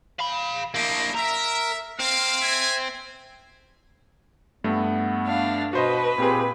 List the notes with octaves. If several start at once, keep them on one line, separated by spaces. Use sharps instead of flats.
F5 B5
A#3 D4 E4 C5 D#5
A#4 E5
A#3 C4 F5
E5 G#5
G2 A3 B3
D4 F5
B2 F#4 B4 C5 D#5
A#2 C4 G4 G#4